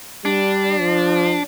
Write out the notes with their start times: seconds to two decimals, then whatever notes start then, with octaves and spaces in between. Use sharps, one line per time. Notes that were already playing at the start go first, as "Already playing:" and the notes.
0.25 G3 D4
0.81 F3